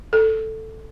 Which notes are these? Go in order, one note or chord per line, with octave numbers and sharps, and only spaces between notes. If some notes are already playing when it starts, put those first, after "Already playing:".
A4